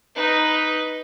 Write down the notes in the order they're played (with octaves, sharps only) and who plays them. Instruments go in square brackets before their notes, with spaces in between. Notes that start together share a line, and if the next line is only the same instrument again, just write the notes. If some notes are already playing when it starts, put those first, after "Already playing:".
[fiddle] D#4 B4